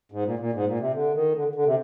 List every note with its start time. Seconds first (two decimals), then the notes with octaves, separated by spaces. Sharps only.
0.12 G#2
0.25 A#2
0.39 A#2
0.53 G#2
0.66 A#2
0.80 C3
0.94 D3
1.14 D#3
1.35 D3
1.55 D3
1.66 C3